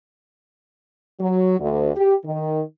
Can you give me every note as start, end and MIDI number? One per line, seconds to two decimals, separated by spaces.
1.20 1.59 54
1.59 1.89 38
1.95 2.14 67
2.25 2.61 51